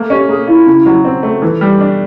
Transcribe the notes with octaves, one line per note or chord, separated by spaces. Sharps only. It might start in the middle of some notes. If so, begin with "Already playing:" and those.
Already playing: A3 A#3
C#4 G4
A#3 G#4
E4 F4
C#3
F#3
C4
A3
E3
G3
D4